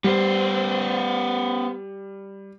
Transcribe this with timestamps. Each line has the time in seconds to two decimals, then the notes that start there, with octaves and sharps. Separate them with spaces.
0.04 G3 B3 C5